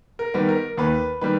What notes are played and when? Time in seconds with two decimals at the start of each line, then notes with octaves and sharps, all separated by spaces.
0.19 A#4
0.34 D#3 G3 B3
0.49 A#4
0.77 D#2 B4
1.21 D#3 G3 B4